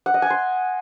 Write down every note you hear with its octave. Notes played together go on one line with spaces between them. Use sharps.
F#5
D#5
G#5
C6